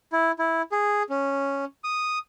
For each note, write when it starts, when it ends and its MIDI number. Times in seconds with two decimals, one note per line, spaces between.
0.13 0.31 64
0.39 0.62 64
0.72 1.03 68
1.10 1.65 61
1.84 2.18 87